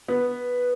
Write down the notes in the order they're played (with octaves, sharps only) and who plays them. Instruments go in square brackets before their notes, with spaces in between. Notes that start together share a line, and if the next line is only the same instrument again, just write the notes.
[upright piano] B3